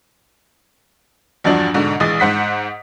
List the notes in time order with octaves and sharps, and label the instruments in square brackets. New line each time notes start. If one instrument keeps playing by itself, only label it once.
[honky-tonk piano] E2 G2 F3 F#3 D4
G#2 B2 D3
A#1 E3 G#3 D#6 A6
G#2 C5 F#5 B6